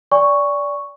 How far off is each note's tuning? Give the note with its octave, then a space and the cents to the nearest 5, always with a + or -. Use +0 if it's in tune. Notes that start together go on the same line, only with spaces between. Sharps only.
D5 -20 G#5 -35 C#6 +0